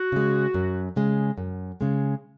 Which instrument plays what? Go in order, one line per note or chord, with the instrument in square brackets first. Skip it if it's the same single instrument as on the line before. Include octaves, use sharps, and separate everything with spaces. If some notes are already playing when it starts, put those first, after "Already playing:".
Already playing: [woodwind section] F#4
[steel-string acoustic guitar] C#3 G#3
F#2
C#3 G#3
F#2
C#3 G#3